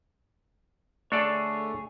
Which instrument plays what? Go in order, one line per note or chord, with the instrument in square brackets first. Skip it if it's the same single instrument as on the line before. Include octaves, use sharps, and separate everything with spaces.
[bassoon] D3 [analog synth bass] A3 [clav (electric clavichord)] D4 A4 D5 [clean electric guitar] G#4 C#5